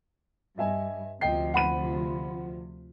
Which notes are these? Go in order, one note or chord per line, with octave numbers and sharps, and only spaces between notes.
G2 D#5 E5 G#5
D2 C3 F3 D#5 G5 C7
F#5 B5 D#7